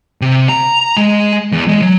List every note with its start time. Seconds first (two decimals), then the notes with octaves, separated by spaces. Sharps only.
0.21 C3
0.49 A#5
0.97 G#3
1.52 E2
1.68 G#3
1.82 F#3